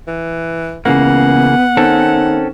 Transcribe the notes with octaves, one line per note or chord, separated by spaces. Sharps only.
E3
C#2 C#3 E3 A#3 B3 F#5
D#3 C4 C#4 A4